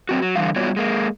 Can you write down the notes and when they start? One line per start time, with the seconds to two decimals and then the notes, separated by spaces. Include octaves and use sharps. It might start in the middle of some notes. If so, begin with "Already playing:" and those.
0.09 F#3 C4 F#4
0.22 F#3
0.36 D3 E3 F3 G3 F5
0.56 G3 B3 F4 F#4 C#5 D5
0.76 G#3 A#3